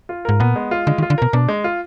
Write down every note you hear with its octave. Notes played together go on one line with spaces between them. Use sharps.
F4
G#2 A#4
A#2 B3
G#3
F4
D3 G#3
D#3
F4
D3
B2 A#4
B2 D4
G#3
F4